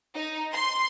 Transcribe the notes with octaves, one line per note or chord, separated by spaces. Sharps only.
D#4
C6